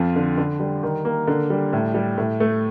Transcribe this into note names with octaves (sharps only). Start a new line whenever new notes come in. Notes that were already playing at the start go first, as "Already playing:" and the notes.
Already playing: F2 F3
D3
D3
G3
D#3
A#3
D3
G3
A2
G3
A2
A3